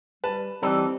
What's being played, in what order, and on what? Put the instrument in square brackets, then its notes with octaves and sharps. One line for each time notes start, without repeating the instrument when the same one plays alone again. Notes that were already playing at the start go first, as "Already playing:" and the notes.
[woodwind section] G3 [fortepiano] B4 A5
[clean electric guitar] E3 D#4 A4 [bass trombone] G3 [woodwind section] C4